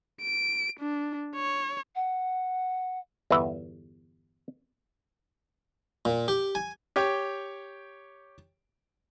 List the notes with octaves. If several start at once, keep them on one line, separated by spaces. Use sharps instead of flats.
D7
D4
C#5
F#5
G1 E2 B4 E5
A#2
G4
G#5
G4 C#5 G5